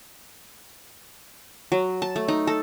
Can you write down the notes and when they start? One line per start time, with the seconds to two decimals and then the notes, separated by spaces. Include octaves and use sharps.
1.72 F#3
2.02 A5
2.16 A3
2.28 D#4
2.47 A4